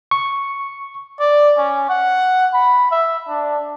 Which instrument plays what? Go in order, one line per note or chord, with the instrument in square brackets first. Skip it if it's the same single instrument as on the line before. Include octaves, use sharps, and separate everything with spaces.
[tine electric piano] C#6
[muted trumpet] D5
C#4
F#5
B5
E5
D4